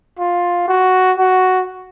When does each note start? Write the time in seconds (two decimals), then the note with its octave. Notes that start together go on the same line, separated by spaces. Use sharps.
0.19 F4
0.68 F#4
1.18 F#4